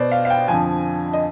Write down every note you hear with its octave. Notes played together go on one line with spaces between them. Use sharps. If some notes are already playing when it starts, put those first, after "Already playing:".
Already playing: B2 C5 D5
F5
F5
G5
F2 D3 F3 G#5
D#5